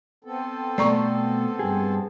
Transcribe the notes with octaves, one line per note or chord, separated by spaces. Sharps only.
B3 C4 A4
B2 A3 D5 A#5 C#6
G2 G#4